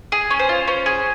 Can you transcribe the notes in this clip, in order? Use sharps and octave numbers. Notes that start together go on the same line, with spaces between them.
G#4
C#4
C5
F4
C#4 C5
G#4